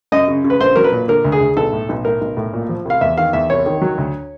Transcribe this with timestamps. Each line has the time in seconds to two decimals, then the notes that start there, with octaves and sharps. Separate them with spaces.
0.12 F#2 D#5
0.28 C#3
0.44 C#3
0.50 B4
0.60 A#1 C5
0.76 F#3 A#4
0.84 B4
0.92 A#2
1.08 D3 A#4
1.25 D2
1.32 G#4
1.41 D2
1.57 B1 A4
1.73 A2
1.89 B1
2.05 A2 A#4
2.21 B1
2.37 A2
2.54 A#2
2.69 F3
2.85 C2 F5
3.01 E2 E5
3.18 D#3 F5
3.33 E2 E5
3.50 C2 C#5
3.66 D#3
3.81 F#3
3.98 D2